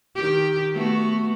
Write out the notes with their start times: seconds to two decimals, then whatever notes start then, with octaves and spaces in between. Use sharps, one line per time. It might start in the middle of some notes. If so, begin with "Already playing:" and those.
0.15 D#3 G4
0.73 A3 B3 F#4